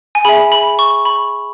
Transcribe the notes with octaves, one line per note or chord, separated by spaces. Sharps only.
G#5
G#4 E5 B5
B5
C#6
B5